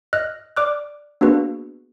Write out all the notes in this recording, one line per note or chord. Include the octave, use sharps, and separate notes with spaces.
D#5 F6 F#6
D5 D6 F6 F#6
A#3 B3 D4 F#4 G#4 B4